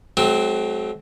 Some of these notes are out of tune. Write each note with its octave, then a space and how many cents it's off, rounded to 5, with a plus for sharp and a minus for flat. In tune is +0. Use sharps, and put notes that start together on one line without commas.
F#3 +15 A3 -45 C4 +0